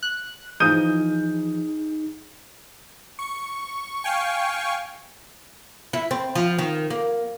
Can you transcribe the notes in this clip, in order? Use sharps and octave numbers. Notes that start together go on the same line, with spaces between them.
F#6
E3 F3 D#4 G#4 D#5 D#6 G6 D#7
C#6
F5 G5 G#5 C#6
E4
C4
F3
D#3
A#3